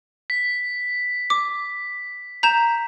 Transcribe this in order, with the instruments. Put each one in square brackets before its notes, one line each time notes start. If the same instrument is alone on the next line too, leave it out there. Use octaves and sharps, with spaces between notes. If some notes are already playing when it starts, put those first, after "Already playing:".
[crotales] B6
[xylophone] D6
A#5 G6 E7